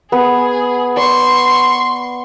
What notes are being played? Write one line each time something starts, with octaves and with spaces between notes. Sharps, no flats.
B3 G#4
D5 C6 C#6